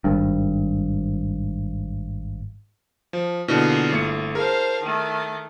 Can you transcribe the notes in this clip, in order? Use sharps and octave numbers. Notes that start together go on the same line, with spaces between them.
G#1 G2
F3
B2 D3 A#3 E4 F4 G#4 D#5
G1 A3 C#7
G#4 A#4 C5 F5 A5
D#3 A3